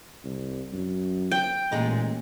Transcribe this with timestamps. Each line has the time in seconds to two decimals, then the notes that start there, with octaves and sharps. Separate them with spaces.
0.24 C2
0.73 F#2
1.31 G5
1.72 A1 A#2 G#3 D#4